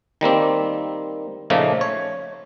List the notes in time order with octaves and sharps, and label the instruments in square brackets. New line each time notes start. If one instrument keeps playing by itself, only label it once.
[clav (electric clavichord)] D#3 G3 A#3 C4
A#2 C#3 F3 A3 A#3 D#4
C#5